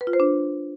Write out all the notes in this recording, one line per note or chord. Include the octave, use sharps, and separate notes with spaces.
B4
F4
C5
D4